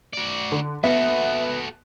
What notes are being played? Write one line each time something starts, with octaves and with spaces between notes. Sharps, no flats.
F#4 D5
D3
B3 F#4 A4 E5